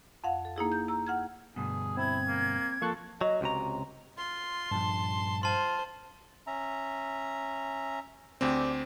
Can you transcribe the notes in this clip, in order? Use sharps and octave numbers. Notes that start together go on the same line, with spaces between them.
F2 F5 F#5
A4
A#3 D#4 E4 G#4
G6
A#5 E6
F#5 F6 G#6
D2 G2 B2 G#4
C4 E4 G#6
A#3
F3 A#3 A4 C#6 F#6
F#3 D#5
C#2 C3 F#4 A#5
F4 C6
G2 A#2 F3 A5
F4 C5 A5 C6
C#4 E5 A#5
D2 C4 G4 D5